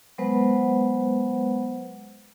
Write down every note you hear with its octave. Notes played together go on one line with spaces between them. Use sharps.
F#3 G#3 B3 B4 C5 F#5